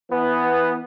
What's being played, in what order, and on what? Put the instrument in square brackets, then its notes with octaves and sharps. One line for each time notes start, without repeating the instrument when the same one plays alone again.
[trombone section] E3 B3